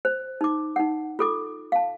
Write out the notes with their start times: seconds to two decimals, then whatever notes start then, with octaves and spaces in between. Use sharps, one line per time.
0.05 C5
0.41 D#4 D6
0.76 D#4 F#5
1.19 F4 A4 D6
1.72 F5 A5